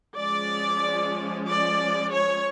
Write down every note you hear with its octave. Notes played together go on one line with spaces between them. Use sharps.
F3 G#3 C#4 D5
D5
C#5